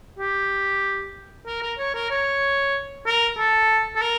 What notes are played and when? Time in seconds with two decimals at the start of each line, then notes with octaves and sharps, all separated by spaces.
0.19 G4
1.47 A#4
1.62 A#4
1.78 C#5
1.94 A#4
2.10 C#5
3.06 A#4
3.38 A4
3.96 A4
4.02 A#4